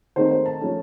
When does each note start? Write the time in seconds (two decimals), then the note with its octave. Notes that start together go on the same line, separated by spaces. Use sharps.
0.16 D#3 A3 C4 D#4 C5
0.31 C5
0.46 A5
0.61 F3 A3 C#4